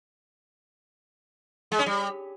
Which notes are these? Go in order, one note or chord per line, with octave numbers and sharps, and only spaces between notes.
G#3
C#4
G3